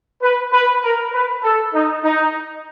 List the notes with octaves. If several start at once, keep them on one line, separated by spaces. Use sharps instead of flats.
B4
B4
A#4
B4
A4
D#4
D#4